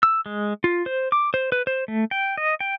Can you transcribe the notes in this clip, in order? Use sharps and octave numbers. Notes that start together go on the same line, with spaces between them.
E6
G#3
F4
C5
D6
C5
B4
C5
A3
G5
D#5
G5